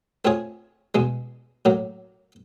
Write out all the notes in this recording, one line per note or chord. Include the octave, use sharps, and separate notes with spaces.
A3 C4 F4 G#4 C#5
E2 B2 G#3
A2 F#3 A#3